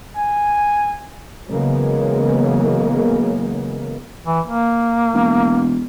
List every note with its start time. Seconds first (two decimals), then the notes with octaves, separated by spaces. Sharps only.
0.16 G#5
1.50 C#3 E3 F#3 G#3 A#3 B3
4.26 E3
4.47 A#3
5.14 E1